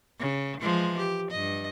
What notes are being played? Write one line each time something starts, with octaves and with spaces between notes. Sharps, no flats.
C#3
E3 F3 G#3
G4
G2 D#5